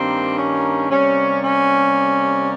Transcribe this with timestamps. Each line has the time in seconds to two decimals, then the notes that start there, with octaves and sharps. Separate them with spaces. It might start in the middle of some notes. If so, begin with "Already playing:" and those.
Already playing: G2 D#3 A#3 C4
0.39 C#4
0.91 C3 G3 A#3 C#4
1.43 C#4